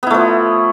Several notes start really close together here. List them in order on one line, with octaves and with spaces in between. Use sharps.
B3 E4 A3 F3